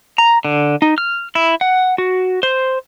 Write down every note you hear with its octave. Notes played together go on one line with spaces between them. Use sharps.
A#5
D3
D#4
F6
E4
F#5
F#4
C5